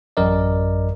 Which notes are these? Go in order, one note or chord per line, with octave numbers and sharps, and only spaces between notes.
A1 F#2 A#4 D5 D#5